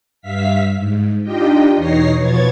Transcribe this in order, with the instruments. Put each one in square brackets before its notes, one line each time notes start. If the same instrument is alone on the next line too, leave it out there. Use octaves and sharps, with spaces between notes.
[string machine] G2 E5 F5 B6
G#2
D4 D#4 F4 G4 D#5 G5
E2 B2 D#4 C#5 A#6 C7
B2 F3 B3 C#5 G#6 A6